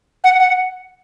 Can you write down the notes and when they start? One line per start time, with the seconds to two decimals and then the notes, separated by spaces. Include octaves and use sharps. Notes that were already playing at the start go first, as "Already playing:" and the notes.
0.24 F#5
0.39 F#5